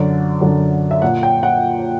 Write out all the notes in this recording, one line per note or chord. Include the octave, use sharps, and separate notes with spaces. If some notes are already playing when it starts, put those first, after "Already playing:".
Already playing: F#2 D3 D5
F#2 D3
E5
A#2 F#5
G5
F#5